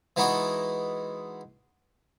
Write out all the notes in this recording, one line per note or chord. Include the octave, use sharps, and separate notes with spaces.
E3 G#3 B3 D#4 E4 F#4